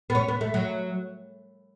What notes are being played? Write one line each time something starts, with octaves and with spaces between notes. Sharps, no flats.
B3
C#4
B3
A3
F#3